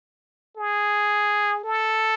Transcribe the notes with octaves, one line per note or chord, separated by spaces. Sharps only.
G#4
A4